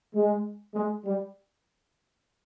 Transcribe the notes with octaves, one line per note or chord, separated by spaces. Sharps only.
G#3
G#3
G3